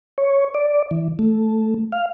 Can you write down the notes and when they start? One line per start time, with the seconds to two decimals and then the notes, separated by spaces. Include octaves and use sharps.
0.18 C#5
0.55 D5
0.91 E3
1.19 A3
1.92 F5